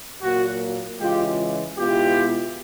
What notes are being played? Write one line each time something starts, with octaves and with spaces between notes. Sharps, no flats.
A#2 F#3 A#3 F#4
C#3 E3 G#3 F4 G4
B2 G#3 B3 E4 F4 G4